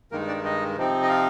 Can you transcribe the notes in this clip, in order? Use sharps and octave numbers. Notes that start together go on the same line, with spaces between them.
G2 D#3 G#3 A#3 D#4 A#4
D4 D5
D#4 D#5
C3 F3 C4 D#4
D#5
F4 F5